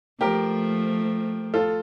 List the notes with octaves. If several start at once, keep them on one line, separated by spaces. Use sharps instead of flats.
F3 A3 G4 A#4
F4 A4